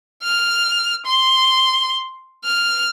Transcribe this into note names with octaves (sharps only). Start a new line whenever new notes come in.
F6
C6
F6